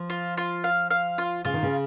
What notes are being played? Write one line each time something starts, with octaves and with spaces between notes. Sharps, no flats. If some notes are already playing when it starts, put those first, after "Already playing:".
Already playing: F3
F4
F4
F5
F5
F4
C#3 F4
D#3
C#3